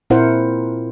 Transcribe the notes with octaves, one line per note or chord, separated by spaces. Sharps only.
A#2 C4 E4 A#4 C5 F#5